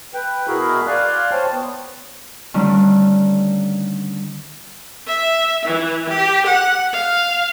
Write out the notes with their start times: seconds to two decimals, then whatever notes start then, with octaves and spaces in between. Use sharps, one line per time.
0.14 B4 G5
0.47 B2 E4 F#4 G#4 A#4 B5
0.87 D5 F5 G#5 C6 F6 F#6
1.32 C5 C#5 G5 A5
1.52 B3
2.54 D3 D#3 G3 A3 C#4 D4
5.07 E5
5.65 E3
6.09 G4
6.46 F#5
6.93 F5